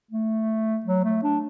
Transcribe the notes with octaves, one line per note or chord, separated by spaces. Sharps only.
A3
F#3
A3
D4